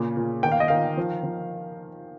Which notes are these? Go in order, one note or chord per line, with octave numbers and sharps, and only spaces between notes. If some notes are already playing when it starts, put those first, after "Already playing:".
Already playing: A#2 C#3
A#2
D#3 G5
F5
D#5
D#3 F5
F3
F3